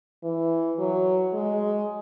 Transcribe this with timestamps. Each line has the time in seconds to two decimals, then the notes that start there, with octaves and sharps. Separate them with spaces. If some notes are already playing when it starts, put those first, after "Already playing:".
0.23 E3
0.78 F#3
1.33 G#3